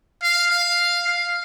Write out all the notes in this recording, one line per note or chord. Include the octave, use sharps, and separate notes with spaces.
F5
F5
F5